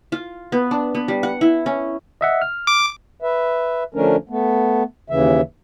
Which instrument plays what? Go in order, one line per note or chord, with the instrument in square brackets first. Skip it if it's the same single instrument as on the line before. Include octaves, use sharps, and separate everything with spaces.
[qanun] F4
B3
D4
B3
G3
F#5
E4
C#4
[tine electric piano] D#5 E5 F#5
F6
[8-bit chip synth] D6
[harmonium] B4 E5
D3 F3 A3 C#4 D4 A#4
A3 B3
D#2 C#3 E3 E5